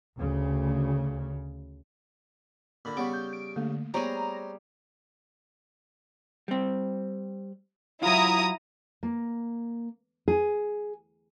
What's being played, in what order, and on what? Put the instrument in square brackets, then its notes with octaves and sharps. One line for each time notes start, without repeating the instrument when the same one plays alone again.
[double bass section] D2 C#3
[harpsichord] A#2 D3 [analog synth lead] B5
[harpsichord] C#3 G3 C#6 [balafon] B3 F#5 [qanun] D6
[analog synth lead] G6
D7
[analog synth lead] D3 [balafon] A3 A#3
[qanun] G3 G#4 [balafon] B3 [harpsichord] C5 C#5 G#5 [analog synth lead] A#5
[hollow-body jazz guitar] G3 C4
[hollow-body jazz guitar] F#3 F4 [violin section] E4 A#5 D#6
[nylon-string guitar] A#3
G#4